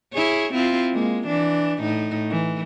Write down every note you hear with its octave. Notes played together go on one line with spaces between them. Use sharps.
E4 G#4 C#5
C4 E4 F4
G#3 A#3
E3 D4
A2 D#4
E3